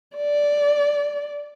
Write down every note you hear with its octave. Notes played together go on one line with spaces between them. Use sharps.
D5